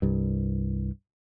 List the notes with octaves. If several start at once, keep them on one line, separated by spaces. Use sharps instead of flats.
C2 G2